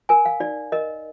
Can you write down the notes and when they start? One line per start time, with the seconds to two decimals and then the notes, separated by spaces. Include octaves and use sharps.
0.09 A#4 G#5
0.25 F5
0.40 D#4 D5
0.72 A#4 D#5